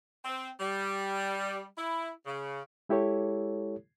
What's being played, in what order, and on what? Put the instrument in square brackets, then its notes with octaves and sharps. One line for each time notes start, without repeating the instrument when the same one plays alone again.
[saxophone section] C4
G3
E4
C#3
[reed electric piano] G#3 E4 G4 A4 C#5